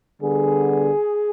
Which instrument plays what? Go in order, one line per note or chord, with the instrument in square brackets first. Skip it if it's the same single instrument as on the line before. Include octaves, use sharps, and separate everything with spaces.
[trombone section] D3 G3 B3 G#4